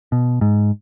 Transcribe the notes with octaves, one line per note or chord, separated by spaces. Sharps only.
B2
G#2